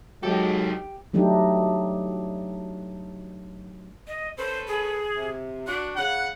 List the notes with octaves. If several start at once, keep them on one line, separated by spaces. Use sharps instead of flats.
F#3 G#3 D#4 G4 A4
F#3 A3 D4 D#4 G4
D#5
C#4 A4 B4 C5
G#4
C3
D4 F#4 F#6
C#3 F#5 F#6